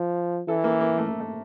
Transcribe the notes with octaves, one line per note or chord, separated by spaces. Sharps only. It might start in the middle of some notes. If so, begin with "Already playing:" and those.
Already playing: F3
E3 A4
A#3
A#3
A3
A#3
A3